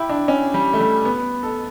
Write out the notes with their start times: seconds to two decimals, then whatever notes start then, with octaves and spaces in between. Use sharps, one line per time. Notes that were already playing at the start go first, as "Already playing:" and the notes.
Already playing: E4 G4
0.10 D4
0.28 C#4
0.54 G3
0.74 A3
0.80 G3
1.05 B3
1.43 A4